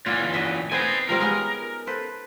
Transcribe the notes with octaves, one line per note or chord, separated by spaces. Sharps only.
A#2 E3 F4 F#4
F#4 D#5 E5
B3 C4 D#4 C5 G#5
F3 G3 C4 A#4
G#3 B3 C#4
A4 B4 C5